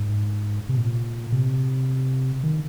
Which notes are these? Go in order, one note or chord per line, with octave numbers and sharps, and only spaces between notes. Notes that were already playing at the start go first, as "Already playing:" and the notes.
Already playing: G#2
C3
A#2
C3
D#3